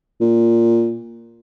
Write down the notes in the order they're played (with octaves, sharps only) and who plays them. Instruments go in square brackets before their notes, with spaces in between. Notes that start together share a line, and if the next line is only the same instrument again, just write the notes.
[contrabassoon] A#2